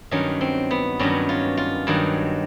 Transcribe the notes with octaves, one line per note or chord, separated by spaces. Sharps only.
G2 D#3 F#3 C#4
C4
B3
G2 D#3 F#3 C#4
F4
F4
G2 D#3 F#3